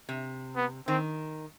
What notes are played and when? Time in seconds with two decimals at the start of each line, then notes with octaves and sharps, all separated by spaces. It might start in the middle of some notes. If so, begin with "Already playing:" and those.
0.09 C3
0.56 B3
0.87 D#3 C4